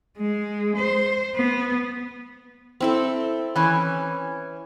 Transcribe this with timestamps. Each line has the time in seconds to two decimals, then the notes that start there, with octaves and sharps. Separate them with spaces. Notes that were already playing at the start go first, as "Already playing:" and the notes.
0.17 G#3
0.76 C5
1.36 B3
2.80 C4 E4 A4
3.56 E3 C#4